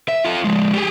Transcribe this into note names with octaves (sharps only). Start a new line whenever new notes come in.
E5
F4 A4
F3 G#3
G4 G#4